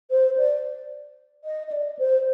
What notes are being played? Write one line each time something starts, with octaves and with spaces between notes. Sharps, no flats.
C5
D5
D#5
D#5
D5
C5